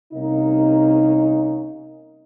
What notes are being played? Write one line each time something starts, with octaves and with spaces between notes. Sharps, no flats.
C2 C3 A#3 C#4 D#4